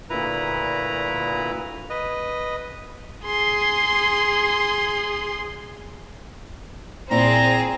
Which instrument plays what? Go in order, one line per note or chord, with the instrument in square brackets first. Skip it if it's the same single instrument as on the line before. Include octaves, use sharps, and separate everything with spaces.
[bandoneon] D2 A#2 E4 B4 A#5
B4 D#5
[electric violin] G#4 C6
[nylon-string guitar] A#2 E4 [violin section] C4 G#4 [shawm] A#5